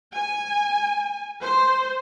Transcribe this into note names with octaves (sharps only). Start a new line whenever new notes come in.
G#5
C5